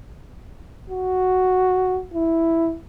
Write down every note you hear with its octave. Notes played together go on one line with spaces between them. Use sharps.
F#4
E4